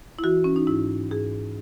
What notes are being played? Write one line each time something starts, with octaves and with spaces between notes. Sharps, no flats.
E4
E3 F#4
C#4
D#4
G#2 E4
G#2 G#4